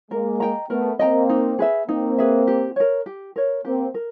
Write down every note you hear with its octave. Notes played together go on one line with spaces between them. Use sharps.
G#3 A#3 A#4
D#5 G5 A#5
A3 B3 A#4
A#3 C4 D#5 G5 A#5
D#4
G#4 B4 E5
A#3 C4 D#4
G#4 B4 E5
G4
A#4 C#5
G4
A#4 C#5
A#3 C4 G4
A#4